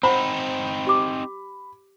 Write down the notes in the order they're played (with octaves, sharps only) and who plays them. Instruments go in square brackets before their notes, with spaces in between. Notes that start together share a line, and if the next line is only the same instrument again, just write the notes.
[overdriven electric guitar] C4 D#4 [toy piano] C5 F#5 [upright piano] B5
[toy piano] G4 D6